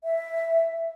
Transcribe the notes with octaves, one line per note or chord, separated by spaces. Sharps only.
E5